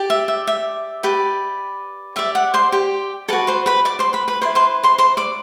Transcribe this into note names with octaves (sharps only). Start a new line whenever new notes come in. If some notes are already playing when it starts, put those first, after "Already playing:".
Already playing: G4 D5
E5
E5
E5
G4 B4 D5
G4 D5 E5
F#5
C5 C6
G4 G5
F#4 A4 B4 D5 A5
C5 C6
B4 B5
D5 D6
C5 C6
B4 B5
B4 B5
E4 B4 C5 D5 C6
C5 C6
C5 C6
C5 C6
D5 D6